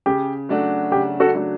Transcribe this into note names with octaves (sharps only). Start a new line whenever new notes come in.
C#3 G4
F#3 A3 D4 F#4
C#3 G4
F#4 A4
F#3 A3 D4 F#4